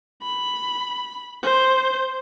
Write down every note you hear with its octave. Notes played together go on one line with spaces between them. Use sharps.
B5
C5